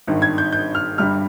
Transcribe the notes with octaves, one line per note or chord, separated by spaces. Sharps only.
G#1 G2 D#3
G#6
G6
G6
F6
G1 G2 G3 F6